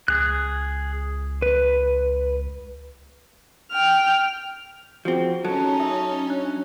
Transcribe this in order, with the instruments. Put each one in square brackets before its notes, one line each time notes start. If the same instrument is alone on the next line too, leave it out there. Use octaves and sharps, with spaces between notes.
[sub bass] C#2 [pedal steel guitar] G#4 F#6
[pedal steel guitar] B4
[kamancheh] G5 F6
[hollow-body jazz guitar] F3 C4 [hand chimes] F4 G#4 [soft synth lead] F#4
[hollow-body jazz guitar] F#3 [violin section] C#4 D#4 [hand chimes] A4 [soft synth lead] A5
[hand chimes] E5 D#6
D4 F#6